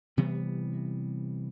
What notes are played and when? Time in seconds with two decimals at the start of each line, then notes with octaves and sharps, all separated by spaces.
0.17 C3 E3 G3 B3